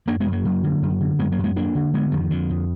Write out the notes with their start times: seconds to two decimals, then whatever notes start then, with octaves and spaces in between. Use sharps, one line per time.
0.07 F#2 A#3 D4
0.20 G#3 B3
0.26 F#2
0.32 F#3 A#3
0.45 F#2
0.63 D3
0.82 F#2
1.00 D3
1.19 F#2 G#3 B3
1.32 F#3 A#3
1.38 F#2
1.44 G#3 B3
1.56 F2 A#3 D4
1.75 D3
1.94 D3 G#3 B3
2.12 F2 D#3
2.31 F2 D3
2.50 F2